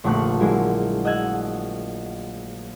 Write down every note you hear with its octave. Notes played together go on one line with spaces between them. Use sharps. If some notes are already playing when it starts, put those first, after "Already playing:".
F1 A#1 D3 A3 C#6 F#6
D3 F#3 G#3 A#3 E4 F#4
D#5 F#5 E6 F#6 G#6